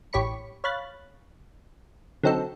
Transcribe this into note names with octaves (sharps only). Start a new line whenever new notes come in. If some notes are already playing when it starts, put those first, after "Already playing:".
A1 G4 C#5 B5 C#7
C#5 F5 B5 F#6 A6
D3 F#3 C4 D#4 A4